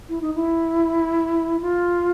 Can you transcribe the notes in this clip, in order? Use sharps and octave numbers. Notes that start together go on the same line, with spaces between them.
E4
D#4
E4
F4